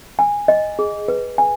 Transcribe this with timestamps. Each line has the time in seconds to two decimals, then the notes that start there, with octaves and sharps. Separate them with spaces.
0.19 G#5
0.48 D#5
0.79 G#4
1.08 B4
1.38 G#5